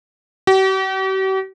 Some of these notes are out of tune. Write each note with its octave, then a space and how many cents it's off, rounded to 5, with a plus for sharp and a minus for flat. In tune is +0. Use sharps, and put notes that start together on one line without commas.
G4 -45